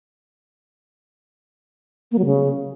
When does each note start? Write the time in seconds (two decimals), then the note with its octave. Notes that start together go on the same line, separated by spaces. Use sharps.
2.12 A#3
2.18 F#3
2.25 C#3